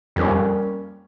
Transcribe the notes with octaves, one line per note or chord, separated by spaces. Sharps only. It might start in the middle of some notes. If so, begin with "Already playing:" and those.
F2 G3 A#3 C#4